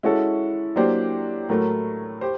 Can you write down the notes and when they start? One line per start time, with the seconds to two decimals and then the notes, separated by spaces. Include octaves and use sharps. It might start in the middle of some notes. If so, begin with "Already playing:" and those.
0.03 G#3 C#4 E4 F#4 A4
0.76 F#3 A#3 D4 G4 C5
1.49 A2 F#3 A3 A#4
2.21 G4 C5